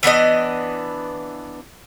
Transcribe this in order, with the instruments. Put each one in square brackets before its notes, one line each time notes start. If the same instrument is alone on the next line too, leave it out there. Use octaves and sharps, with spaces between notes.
[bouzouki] E3 B3 D4 D#5